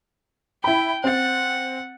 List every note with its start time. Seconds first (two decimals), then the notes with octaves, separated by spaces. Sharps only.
0.64 E4 G5 B5
1.04 C4 F#5 A6